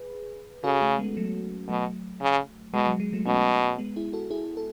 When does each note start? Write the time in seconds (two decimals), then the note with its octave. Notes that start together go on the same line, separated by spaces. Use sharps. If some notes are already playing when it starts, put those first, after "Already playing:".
Already playing: G#4 B4
0.64 C#3 F#4 A4
0.81 A3 C#4
0.99 G#3 B3
1.17 F#3 A3
1.68 B2 F#3 A3
2.21 C#3
2.74 B2 G#3
2.87 F#3
3.00 G#3
3.13 F#3 A3
3.26 B2 A3 C#4
3.78 G#3 B3
3.96 E4 G#4
4.13 F#4 A4
4.30 E4 G#4
4.57 A4